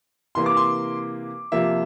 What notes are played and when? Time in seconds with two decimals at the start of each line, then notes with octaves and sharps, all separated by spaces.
0.35 C3 E3 A#3 C6
0.46 D6
0.57 C6
1.52 C3 F3 A#3 E5